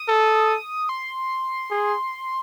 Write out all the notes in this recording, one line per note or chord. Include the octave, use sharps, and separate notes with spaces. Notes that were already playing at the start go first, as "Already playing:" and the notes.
Already playing: D#6
A4
C6
G#4